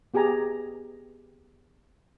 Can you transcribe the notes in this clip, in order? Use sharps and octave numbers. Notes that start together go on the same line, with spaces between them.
B3 G4 G#4 G#5 A#5